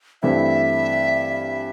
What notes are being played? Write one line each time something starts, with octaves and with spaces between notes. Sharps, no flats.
G2 E3 A3 C4 E4 E5